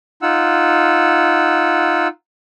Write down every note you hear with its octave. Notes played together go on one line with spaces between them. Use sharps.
D#4 F4 F#5 E6